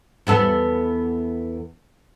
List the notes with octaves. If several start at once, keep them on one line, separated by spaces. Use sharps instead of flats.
E2 B3 A4